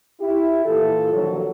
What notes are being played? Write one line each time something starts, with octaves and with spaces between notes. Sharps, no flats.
E4 G4
A#2 E3 F4 A4
D3 D#3 F3 F#3